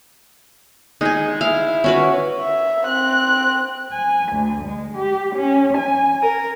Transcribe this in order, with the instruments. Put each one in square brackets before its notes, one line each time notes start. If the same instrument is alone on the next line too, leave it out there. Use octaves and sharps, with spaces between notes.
[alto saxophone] G#3 [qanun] D#4 G#4
[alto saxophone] E4 [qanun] F5
[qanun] C#4 F#4 B4
[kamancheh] E5
C4 F#6
[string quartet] G#5
D2
G#3
G4
C#4
G#5
A#4